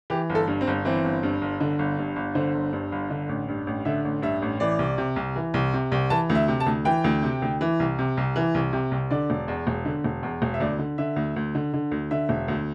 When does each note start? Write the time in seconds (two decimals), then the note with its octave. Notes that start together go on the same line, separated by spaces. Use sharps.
0.10 E3 G4
0.30 G1
0.35 A4
0.47 G2
0.61 C4
0.67 G1
0.85 E3 C4
1.04 G1
1.23 G2
1.42 G1
1.60 D3
1.79 G1
1.98 G2
2.16 G1
2.35 D3 C5
2.55 G1
2.73 G2
2.92 G1
3.10 D3
3.29 A1
3.48 G2
3.67 A1
3.85 D3 E5
4.05 A1
4.22 G2 E5
4.42 A1
4.60 E3 D5
4.79 C2
4.98 C3
5.16 C2
5.36 E3
5.54 C2
5.74 C3
5.92 C2
6.10 E3 A5
6.29 D2
6.35 E5
6.48 C3
6.60 A5
6.66 D2
6.85 E3 G5
7.04 D2
7.23 C3
7.42 D2
7.61 E3
7.80 C2
7.99 C3
8.17 C2
8.36 E3
8.54 C2
8.73 C3
8.91 C2
9.11 D3 D5
9.30 E1
9.48 E2
9.67 E1
9.85 D3
10.04 E1
10.23 E2
10.42 E1
10.54 E5
10.60 D2 D5
10.79 D3
10.98 D3 E5
11.16 D2
11.36 D2
11.55 D3
11.74 D3
11.91 D2
12.11 D3 E5
12.29 E1
12.48 D2